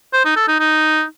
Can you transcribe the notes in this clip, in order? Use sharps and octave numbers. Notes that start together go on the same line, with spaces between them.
C5
D#4
A4
D#4
D#4